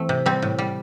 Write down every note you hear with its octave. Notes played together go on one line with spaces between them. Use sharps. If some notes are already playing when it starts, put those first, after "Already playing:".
Already playing: E3 A3 C4
C3
G3 C4
A2
G3